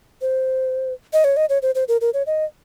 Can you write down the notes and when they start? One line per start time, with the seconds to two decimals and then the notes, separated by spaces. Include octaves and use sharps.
0.21 C5
1.13 D#5
1.24 C#5
1.37 D#5
1.49 C#5
1.62 C5
1.75 C5
1.88 A#4
2.01 A#4
2.14 C#5
2.27 D#5